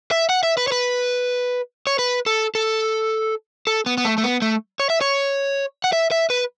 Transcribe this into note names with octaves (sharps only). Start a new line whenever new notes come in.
E5
F#5
E5
B4
C#5
B4
C#5
B4
A4
A4
A4
B3
B3
A3
A3
B3
A3
C#5
E5
C#5
F#5
E5
E5
B4